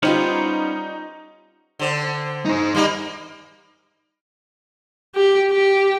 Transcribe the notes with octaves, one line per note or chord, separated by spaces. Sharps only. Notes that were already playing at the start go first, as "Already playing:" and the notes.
G3 B3 C#4 D#4 F4 G4 C5
D3 C4
D#4 C5
G3 A#3 D#4
G4
G4